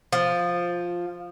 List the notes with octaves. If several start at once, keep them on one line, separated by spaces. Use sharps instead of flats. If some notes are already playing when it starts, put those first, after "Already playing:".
F3